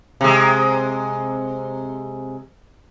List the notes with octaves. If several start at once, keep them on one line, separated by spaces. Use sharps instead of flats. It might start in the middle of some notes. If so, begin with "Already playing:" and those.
C3 G#3